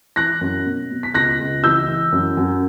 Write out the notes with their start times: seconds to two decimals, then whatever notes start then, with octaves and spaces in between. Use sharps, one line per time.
0.16 E3 F#6 A#6
0.41 F#2
0.66 B2
0.90 B2
1.03 B6
1.14 C#2 F#6 A#6
1.40 C#2
1.64 E3 E6 G6
1.87 E3
2.12 F#2
2.37 F#2